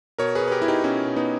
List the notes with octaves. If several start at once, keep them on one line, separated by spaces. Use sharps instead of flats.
B2 A#4 C#5
G#4 B4
B2
B4
G4 A#4
B2 E4
D#4 G4
B2 C#4 E4
B2
B3 D#4